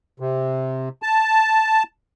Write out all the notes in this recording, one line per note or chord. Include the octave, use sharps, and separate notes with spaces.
C3
A5